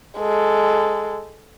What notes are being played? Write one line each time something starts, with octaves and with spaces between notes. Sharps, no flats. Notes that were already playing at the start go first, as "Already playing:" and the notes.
G#3 A4